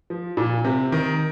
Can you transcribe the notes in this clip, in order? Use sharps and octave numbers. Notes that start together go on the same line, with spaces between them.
F3
A#2
C3
D#3